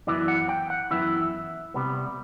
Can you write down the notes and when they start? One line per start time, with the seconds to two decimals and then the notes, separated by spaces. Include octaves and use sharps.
0.07 F#2 E3 B3 E4 D5
0.28 F#5
0.49 G5
0.70 F#5
0.91 F#2 E3 B3 E4 E5
1.74 C3 G3 B3